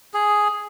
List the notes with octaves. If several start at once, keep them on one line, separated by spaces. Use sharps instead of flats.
G#4